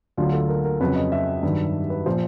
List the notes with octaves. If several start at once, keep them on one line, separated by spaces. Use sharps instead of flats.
D2 D3 F#3 F4
A4
A#4
A#4
F2 C#3 F#3 B4
D#5
E5
G2 D#3 F#3
B4
A#2 F3 C5